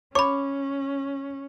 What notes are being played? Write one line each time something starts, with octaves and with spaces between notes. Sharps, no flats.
C#4 C#5 B5 D6